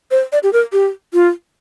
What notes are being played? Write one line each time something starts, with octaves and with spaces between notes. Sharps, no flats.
C5
D5
G4
A#4
G4
F4